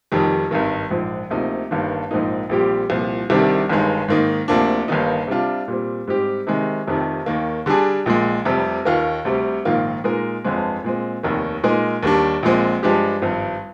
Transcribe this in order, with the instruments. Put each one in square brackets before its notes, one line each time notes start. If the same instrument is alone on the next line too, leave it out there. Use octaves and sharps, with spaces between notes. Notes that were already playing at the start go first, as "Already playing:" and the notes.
[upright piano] F1 F2 D#3 G3
G#1 G2 D#3
A#1 G#2 F3
D2 C3 F3 A#3 D#4
G1 G2 D#3 A#3 D4
A#1 G#2 F3 A#3 D#4
A#1 A#2 G3 C4 G4
C2 A#2 F3
C2 C3 D#3 G3 D4
G1 G2 D#3 G#3
G#2 D#3 A#3 D#4
D2 C3 F3 A#3 D4
G1 G2 D#3 A#3 D#4
C3 G3 D4 F4
A#2 G3 C4
G#2 G3 C4 G4
C3 D#3 G#3
F1 F2 C3 D#3
D#2 D#3 A#3
D3 G3 D4 G#4
A#1 A#2 G#3
F1 F2 C3 G3
D#2 D#3 A#3 F4 A#4
D2 C3 G3 C4
A#1 G#2 D#3 A#3 F4
A#2 G#3 D#4 A#4
G1 F2 D3 G#3 C4
A#2 G#3 C4
F1 D#2 D#3
A#2 G#3 D#4 A#4
D#2 D#3 G3 D4
A#1 A#2 G#3 C4
G2 F3 G#3 D4 G4
G#1 G2 F3